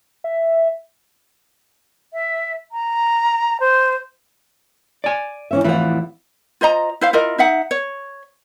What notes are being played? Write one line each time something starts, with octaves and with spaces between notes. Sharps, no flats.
E5
E5
A#5
C5
D5 G#5
E3 C#4 E5
F2 A2 E3 E4 F4 F#5
F4 C5 D#5 A#5
E4 C5 F5
E4 F4 A#4 D#5
D#4 E5 F#5
C#5